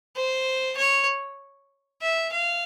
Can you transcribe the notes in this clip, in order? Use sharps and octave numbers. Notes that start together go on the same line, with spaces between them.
C5
C#5
E5
F5